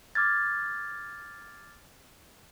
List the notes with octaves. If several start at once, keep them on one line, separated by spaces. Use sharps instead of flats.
D6 F6 G#6 A6